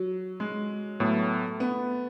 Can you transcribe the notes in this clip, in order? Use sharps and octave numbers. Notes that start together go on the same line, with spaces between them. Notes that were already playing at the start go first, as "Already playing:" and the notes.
Already playing: F#3
G#3
A2 F#3 A3 B3
B3